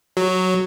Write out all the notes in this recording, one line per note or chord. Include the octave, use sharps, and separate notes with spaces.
F#3